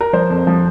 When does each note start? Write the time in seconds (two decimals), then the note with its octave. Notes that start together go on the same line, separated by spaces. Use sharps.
0.01 A#4
0.13 F3 C5
0.30 F2
0.47 F3